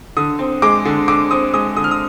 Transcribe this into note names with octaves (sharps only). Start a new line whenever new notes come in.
D3 D#6
C4
G#3 D6
D3
D3 D6
C4 D#6
G#3 D#6
D3 D#6
F6
D#6